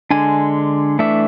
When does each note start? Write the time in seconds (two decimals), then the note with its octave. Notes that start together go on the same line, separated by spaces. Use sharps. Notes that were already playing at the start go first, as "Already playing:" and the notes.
0.11 D3 G#3 D4 G#5
0.99 E3 A3 D4 E5